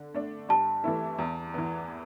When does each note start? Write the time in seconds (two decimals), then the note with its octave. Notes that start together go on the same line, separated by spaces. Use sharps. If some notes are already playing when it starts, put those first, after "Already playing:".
Already playing: D3
0.14 A3 D4
0.49 G2 A5
0.84 E3 A3 E4
1.18 E2
1.54 E3 B3